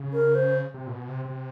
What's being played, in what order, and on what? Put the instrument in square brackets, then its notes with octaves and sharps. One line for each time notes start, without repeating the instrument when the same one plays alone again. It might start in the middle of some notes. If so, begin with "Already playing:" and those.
Already playing: [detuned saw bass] C#3
[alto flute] A#4
C5
[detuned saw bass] C3
A#2
B2
C3
C3